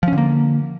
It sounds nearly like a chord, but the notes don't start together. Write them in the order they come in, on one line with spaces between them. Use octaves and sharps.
F3 C#4 D3 A#3